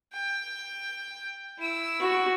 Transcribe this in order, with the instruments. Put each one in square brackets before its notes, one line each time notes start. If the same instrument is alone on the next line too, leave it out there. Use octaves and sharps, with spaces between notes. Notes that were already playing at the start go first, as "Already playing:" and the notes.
[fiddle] G5
E4 E6
[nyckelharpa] F#4